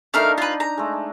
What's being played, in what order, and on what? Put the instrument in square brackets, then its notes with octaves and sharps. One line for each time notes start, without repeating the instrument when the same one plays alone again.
[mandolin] A3 A#4 F5 [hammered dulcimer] D4 D#4
[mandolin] F4 B4
A#5
[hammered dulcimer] G#3 A3